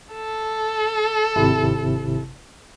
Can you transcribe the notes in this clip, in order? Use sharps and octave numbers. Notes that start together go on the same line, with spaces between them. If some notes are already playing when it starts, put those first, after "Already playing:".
A4
G#1 C3 E4